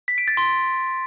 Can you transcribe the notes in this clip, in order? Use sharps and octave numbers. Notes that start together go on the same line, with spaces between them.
B6
D7
A6
C6